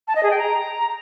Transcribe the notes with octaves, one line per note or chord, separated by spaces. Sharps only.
A5
D#5
G#4
G5
A#5